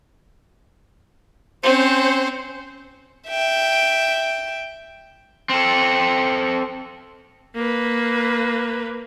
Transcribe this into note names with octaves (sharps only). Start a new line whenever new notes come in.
C4 C#4 C5
E5 G5
C4 A4
A#3 B4